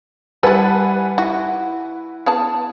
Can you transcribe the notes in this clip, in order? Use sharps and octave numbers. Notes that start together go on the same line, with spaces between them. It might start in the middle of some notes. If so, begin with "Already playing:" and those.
G3 E4 A4 B4 F#5 G#5
E4 F#4
B3 G#4 A5